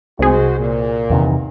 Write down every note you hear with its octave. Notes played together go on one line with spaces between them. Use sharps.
C2 G#3 F#4 G#4 C5
A#2
E2 C3 D#3